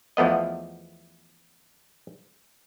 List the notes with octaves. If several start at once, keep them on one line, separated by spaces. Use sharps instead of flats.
E2 F3 A3 B3 D#5